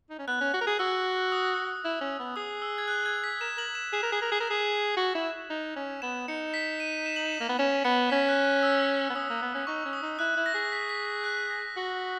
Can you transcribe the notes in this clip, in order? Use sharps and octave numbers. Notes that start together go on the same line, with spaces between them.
D#4
C#4
B3 F#6
C#4
F#4
A#4
G#4
F#4 E6
D#6
E4
C#4
B3
G#4 D#6
E6
G#6
F#6
G#6
B6
A#4 E7
A#4 F#7
E7
G#4 E7
A#4
G#4
A#4
G#4
A#4
G#4
F#4
E4
D#4
C#4
B3 E7
D#4 C#7
B6
D#7
E7
F#7
E7
A#3
B3
C#4 E7
B3 C#7
C#4 B6
F#6
F#6
E6
B3
C#4 D#6
A#3
B3
C#4
D#4 C#6
C#4
D#6
D#4
E4 F#6
E4
A#6
G#4
B6
B6
A#6
F#6
A#6
F#4